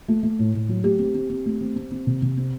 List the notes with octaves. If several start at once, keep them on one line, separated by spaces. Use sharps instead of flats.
A3
A3
A2
A2
F#3
A3 G4
C4
C4
C4
A3
C4
C4
C4
C3
C3
C4